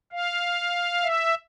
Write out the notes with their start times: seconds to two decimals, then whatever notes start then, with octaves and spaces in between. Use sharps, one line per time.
0.12 F5
1.03 E5